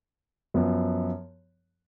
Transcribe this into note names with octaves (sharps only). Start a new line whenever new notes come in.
F#2 F3 B3